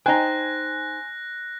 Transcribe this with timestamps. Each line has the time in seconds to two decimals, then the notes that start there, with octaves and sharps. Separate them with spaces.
0.06 D#4 C5 G5 G#5 F#6 A#6